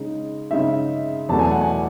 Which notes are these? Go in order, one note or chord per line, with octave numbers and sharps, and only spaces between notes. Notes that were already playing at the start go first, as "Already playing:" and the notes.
Already playing: C#3 G#3 D#4
C#3 G#3 D#4 E5
E2 B2 F#3 A3 A5
G#5
F#5
G#5